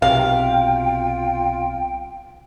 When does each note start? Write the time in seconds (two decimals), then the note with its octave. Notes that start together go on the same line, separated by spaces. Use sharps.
0.02 B1 C3 F4 F5 G5